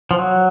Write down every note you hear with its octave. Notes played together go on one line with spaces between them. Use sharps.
F3
F#3